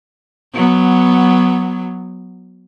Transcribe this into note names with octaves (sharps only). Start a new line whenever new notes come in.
F#3 B3